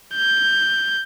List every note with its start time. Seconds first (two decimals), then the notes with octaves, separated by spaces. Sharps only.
0.15 G6